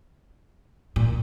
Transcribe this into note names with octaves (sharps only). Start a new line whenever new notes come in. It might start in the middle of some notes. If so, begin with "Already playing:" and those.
A#2